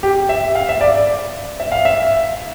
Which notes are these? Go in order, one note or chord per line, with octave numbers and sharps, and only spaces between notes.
G4
E5
F5
E5
D5
D5
E5
F5
E5